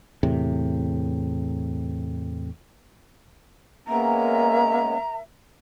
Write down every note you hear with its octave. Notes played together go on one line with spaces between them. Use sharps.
E2 A2 C3
G#3 A#3 B3 C#4 A#4 E5 A#5